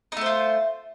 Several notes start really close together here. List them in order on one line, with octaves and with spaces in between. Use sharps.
D#4 A3 C5 F4